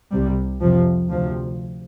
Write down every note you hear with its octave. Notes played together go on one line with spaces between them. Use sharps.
C2 C3 G3
F2 C3 F3
D2 C3 F3